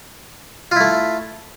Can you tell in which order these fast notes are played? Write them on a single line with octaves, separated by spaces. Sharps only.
F4 E4 A3